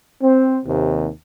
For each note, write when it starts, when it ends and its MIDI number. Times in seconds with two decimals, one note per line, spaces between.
0.22 0.59 60
0.66 1.09 39
0.66 1.09 48